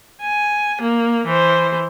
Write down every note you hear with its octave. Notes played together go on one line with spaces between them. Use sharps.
G#5
A#3
E3 C5